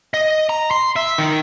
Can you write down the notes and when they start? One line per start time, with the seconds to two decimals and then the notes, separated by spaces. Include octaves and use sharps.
0.14 D#5
0.49 A#5
0.71 C6
0.96 E5
1.18 D#3